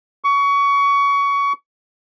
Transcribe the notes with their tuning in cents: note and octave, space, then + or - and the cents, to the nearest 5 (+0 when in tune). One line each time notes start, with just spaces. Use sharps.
C#6 +25